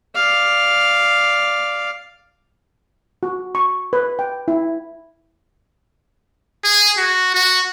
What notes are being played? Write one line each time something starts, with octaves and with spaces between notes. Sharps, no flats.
D5 F5
F#4
C#6
B4
G5
E4
G#4
F#4
F#4